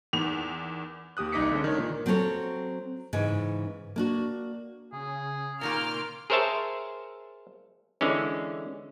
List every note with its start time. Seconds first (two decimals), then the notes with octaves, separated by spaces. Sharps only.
0.13 E2 D#3 F7
1.17 D#2 G4 D#6 F#6
1.32 C2 D#4 D#5 D6 B6 C#7
1.52 D3 G#3 C#4
1.64 D#3 D4 C#5
1.78 A#2 D#3
2.06 F#3 C4 C#4 A4 C#5
3.13 G#2 C#3 E3 G#3
3.96 A#3 D4 F#4
4.92 C#3 G#4
5.61 A#2 D#3 A#3 A#4 C6 D6 F6
6.30 G#4 A#4 C5 C#5 E5 A5
8.01 D3 E3 G#3 C#4